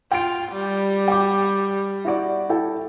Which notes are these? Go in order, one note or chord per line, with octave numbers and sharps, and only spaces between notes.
F4 G5 D7
G3
G5 D6
E4 F#4 D5
E4 A4 G5